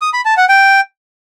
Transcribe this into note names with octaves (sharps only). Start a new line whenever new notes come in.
D#6
B5
A5
F#5
G5